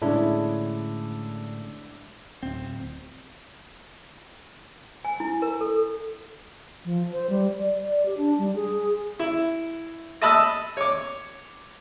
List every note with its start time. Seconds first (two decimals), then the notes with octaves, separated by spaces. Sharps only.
0.02 A2 D3 G#3 C#4 D4 E4
2.43 D1 C4
5.05 G#5
5.20 E4
5.42 A#4
5.61 A4
6.85 F3
7.12 C5
7.30 G3
7.58 D5
7.83 D5
8.06 G4
8.17 D4
8.38 G3
8.55 G#4
9.19 E4
10.22 D#5 E5 A5 B5 D#6 E6
10.77 C#5 D6